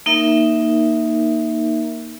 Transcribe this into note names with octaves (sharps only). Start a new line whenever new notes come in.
A#3 D#4 A#4 E5